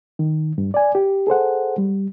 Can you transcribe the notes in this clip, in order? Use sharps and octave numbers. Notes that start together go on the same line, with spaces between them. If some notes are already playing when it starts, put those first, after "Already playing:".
D#3
G2
D5 G#5
G4
G#4 A4 C5 F#5
G3